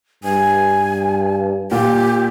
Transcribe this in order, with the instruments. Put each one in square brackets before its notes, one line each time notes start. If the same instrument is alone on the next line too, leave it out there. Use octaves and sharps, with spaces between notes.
[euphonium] G2 [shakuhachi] G#5
[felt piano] A#2 [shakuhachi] G4